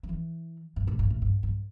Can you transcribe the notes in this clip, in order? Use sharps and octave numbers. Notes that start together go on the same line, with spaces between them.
F#3
E3
G2
A2
G2
A2
G2
G2